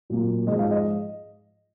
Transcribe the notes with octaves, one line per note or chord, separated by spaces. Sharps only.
A#2 F#3 A#3
G#2 F3 G#3 D#5
F5
D#5